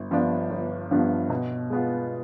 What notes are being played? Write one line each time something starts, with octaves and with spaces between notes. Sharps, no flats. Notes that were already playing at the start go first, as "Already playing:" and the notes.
Already playing: G1
G2 F3 B3 D4
G1
G2 F3 B3 D4
B2
G#3 B3 F4